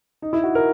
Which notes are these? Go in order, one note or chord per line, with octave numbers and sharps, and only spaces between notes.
D#4
E4
F#4
A#4